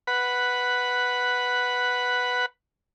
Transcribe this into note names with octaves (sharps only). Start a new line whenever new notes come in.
B4 F#5 B5